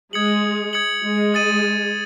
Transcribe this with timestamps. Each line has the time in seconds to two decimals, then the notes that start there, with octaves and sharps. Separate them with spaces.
0.13 G#3 D#6 G#6 C#7 F#7
0.73 D#6 G#6 C#7 F#7
1.04 G#3
1.34 D#6 A6 D#7 F#7